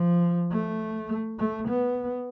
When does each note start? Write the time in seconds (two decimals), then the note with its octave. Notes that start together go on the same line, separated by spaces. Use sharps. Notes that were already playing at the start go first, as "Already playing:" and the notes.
Already playing: F3
0.51 A3
1.39 A3
1.68 B3